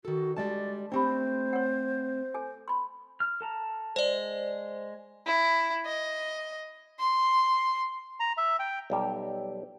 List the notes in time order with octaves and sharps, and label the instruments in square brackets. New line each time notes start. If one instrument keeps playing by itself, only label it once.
[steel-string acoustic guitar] D#3 A4 [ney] F#4
[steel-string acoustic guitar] G3 G#3 A5 [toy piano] D4 D#5 [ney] D5
[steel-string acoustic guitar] A3 C4 [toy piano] D4 G4 B5 [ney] C5
[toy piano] C#5 F#5
A4 G#5
B5 C6
[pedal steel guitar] F6
A4 A5 A#5
[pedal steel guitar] G#3 [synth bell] C5 D5
[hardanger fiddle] E4
D#5
C6
[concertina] A#5
E5
G5
[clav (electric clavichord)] B1 G3 G4